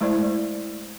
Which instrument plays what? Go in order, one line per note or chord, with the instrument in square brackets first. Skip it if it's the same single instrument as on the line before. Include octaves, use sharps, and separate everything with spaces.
[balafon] G#3 A3 E4 C5 D5